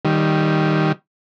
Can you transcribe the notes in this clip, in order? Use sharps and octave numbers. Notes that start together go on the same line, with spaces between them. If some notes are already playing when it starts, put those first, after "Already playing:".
D#3 G3